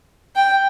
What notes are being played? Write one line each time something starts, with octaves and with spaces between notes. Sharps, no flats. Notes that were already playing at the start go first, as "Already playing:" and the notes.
G5